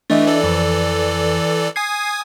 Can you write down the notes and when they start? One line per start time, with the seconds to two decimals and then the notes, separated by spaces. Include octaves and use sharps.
0.10 E3 A3 D4 D#5 E5
0.27 E3 A4 D5
0.44 F2
1.76 G#5 D#6 G#6 C7